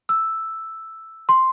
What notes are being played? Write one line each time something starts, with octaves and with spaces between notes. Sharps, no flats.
E6
C6